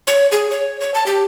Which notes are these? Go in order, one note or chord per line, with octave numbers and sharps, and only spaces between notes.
C#5
G#4
C#5
C#5
A5
G4